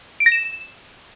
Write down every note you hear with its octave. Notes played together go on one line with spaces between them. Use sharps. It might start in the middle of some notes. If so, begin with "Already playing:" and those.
D7
A#6
E7